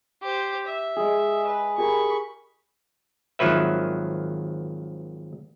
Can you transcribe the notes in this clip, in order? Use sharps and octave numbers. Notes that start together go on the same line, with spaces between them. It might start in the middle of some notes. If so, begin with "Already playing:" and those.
G4 C5
E5
G#3 G#4
B4
G4 G#4 A#4 B5 C#6
G#1 D#3 F3 F#3 B4 E5